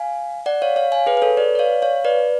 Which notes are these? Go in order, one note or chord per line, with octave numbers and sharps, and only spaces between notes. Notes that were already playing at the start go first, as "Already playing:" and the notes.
Already playing: F5 G#5
D5 F#5
C#5 F5
C#5 F5
F5 G#5
G#4 B4
B4
A4 C#5
B4 D5
D5
C#5 F5
C#5 F5
B4 D5